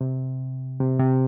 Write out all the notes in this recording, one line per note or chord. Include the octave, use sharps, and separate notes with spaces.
C3
C3
C3